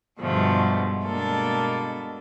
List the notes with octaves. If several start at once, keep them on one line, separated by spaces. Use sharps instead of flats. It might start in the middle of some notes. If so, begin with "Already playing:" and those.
G2 B2 D3 F3 G#3 A3
B2 G#3 A#3 D4 A4